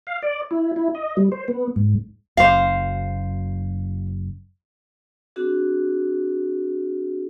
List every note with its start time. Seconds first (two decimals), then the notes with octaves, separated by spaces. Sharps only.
0.07 F5
0.22 D5
0.51 E4
0.76 E4
0.95 D#5
1.17 G3
1.32 C5
1.48 B3
1.76 G#2
2.37 F#1 F#2 C5 F5
5.36 C4 D4 F#4 G#4